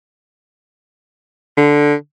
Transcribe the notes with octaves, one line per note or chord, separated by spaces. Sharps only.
D3